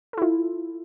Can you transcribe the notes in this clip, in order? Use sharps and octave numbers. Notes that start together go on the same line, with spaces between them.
E4 F4 A4